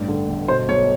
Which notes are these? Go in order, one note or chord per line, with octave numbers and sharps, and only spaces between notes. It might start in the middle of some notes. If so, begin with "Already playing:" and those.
Already playing: A1 G2
D3
G1
B2 C5
B1 C#5